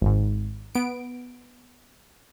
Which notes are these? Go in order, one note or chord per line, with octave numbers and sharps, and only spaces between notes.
G#1 G#2
B3 D7